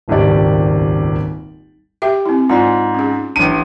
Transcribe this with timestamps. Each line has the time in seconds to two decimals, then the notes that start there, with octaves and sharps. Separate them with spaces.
0.08 D#1 G#1 C#2 G4 D5
2.02 G4 E5 G5
2.26 C4 E4
2.49 G#2 F4 D5 G#5
2.94 C#4 G#4
3.36 A1 D4 C#5 D#7